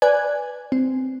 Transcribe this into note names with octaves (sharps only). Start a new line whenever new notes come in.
B4 D5 G#5 F#6 G#6
C4